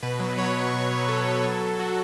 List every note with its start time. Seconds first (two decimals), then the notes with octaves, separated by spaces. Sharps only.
0.03 B2 B4
0.20 F#3
0.37 F#3 C#5
0.55 F#3
0.73 B2
0.91 F#3
1.08 F#3 A4
1.26 F#3
1.44 F#3
1.62 F#3
1.79 F#3 F#4